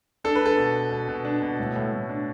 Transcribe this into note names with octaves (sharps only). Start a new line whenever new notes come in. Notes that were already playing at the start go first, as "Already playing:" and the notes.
D4 A4
B4
D4 A4
B2
B3
B2
B2
D4
B2
A2
A2
A2
D4